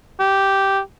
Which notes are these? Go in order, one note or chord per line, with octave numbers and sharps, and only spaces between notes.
G4